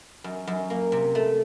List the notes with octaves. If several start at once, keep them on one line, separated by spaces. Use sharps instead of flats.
F#2
F#2
A#3
C3
A3